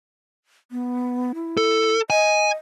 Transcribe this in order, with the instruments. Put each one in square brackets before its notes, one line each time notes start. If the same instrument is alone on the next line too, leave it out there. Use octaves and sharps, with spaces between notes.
[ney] B3
E4
[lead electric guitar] A4
[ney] D#5 [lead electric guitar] G#5